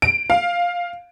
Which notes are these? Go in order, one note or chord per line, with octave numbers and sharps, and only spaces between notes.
D7
F5